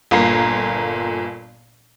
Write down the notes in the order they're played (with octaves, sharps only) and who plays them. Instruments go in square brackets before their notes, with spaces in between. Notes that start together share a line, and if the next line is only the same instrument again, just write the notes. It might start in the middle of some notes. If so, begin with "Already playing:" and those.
[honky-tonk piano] G1 A#2 A#5 C7